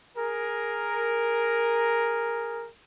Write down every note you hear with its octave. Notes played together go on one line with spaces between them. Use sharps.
G#4 A#4